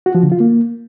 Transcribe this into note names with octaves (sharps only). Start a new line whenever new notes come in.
F#4
F3
D3
F4
A#3